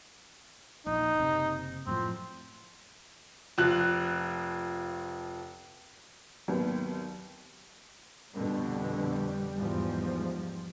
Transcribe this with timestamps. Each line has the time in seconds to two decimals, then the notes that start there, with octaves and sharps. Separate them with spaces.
0.86 D#1 A#1 D#4
1.16 F#1 C3
1.87 F#2 A2 F3 C4
3.58 F1 F3 F#6 F#7
6.48 G#1 D#2 F#3 B3
8.35 F2 B2 D3 G3
9.58 E2 G#2 F3